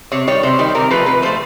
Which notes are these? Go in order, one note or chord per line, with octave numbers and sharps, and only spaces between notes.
C3 C#5
D#3 G3 C#5
C3 C5
D#3 G3
C3 A#4
F3 A3 B4
C3 B4
F3 A3 C5